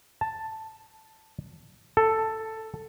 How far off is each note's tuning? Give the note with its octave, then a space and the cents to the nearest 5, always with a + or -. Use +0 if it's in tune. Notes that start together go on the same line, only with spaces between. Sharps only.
A5 +5
A4 +5